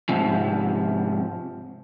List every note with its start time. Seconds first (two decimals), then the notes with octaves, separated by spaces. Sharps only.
0.09 G#2 C3 F3